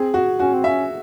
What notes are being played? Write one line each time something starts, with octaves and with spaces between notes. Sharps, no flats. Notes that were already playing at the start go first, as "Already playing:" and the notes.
Already playing: C4 G#4
F#4
C#4 F#4
C4
C#4 E5